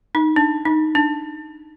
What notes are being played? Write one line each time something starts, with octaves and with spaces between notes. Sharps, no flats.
D#4
D4
D#4
D4